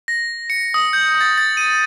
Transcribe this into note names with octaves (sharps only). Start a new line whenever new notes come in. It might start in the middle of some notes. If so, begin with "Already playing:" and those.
A#6
C#7
D#6
G6
A6
A6
D#7